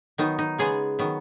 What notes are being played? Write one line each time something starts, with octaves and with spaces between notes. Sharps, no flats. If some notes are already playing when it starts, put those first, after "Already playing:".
D#3 F#3 B3 D#4
D#4
C#3 G#3 B3 G#4
D#3 F#3 B3